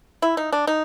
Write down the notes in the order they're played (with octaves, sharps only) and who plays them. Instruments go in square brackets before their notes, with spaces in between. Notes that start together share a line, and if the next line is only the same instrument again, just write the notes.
[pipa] E4
D#4
D4
D#4